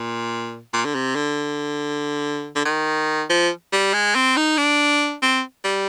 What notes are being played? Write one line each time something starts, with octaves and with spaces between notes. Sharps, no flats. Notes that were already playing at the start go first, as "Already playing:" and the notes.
Already playing: A#2
A#2
D3
C3
D3
D3
D#3
F3
G3
G#3
C4
D#4
D4
C4
G3